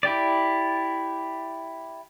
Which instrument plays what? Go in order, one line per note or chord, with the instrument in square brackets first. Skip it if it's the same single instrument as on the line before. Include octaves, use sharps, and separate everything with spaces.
[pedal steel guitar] E4 G4 D5